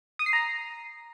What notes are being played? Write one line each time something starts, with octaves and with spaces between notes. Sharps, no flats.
D#6
C7
A#5